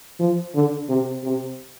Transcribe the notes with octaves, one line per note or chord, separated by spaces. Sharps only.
F3
D3
C3
C3